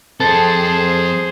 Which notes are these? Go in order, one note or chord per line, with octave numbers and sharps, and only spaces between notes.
F2 C4 G#4 A4 C5